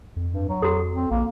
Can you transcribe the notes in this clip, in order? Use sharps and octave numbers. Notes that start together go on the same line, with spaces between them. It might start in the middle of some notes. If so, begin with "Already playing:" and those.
F2
G2
F#3
F2 F#4 A4
C4
A#1 A#3